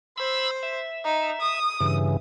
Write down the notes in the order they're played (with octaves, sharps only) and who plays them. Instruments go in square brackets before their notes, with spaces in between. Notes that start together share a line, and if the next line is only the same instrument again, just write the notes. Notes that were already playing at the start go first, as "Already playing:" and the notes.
[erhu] C5 [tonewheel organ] B5 E6
[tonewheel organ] E5
[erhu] D#4
D#6
[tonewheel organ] G2 C#3 E3